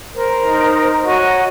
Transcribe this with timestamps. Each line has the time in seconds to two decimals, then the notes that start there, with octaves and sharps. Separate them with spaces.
0.15 A#4 C5
0.44 D#4
1.06 F#4 C#5 D#5 A#5